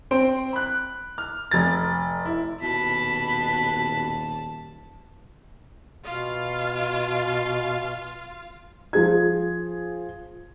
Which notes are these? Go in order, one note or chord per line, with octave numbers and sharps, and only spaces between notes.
C4 C5 D7
B5 F#6
F6
F1 A6
E4
D#1 B2 A5 B5
B2 F4 F5
F3 G#4 G#6